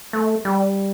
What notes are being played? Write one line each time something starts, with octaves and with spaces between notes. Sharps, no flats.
A3
G3